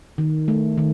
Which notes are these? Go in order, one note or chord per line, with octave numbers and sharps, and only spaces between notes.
D#3
A3
D#3